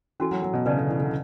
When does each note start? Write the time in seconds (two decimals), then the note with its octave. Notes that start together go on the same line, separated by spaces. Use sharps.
0.20 E3 C#4 F#4 A4
0.31 F#3
0.42 F#3
0.53 B2
0.66 C#3 B4 D5 A5
0.77 D3
0.88 E3
0.99 D3